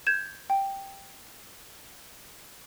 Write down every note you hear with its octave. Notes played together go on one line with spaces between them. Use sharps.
G6 G#6 E7
G5